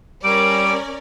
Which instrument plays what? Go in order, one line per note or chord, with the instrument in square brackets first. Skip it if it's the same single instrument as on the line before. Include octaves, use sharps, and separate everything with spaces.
[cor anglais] G3 [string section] C#4 A#4 D5 [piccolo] D7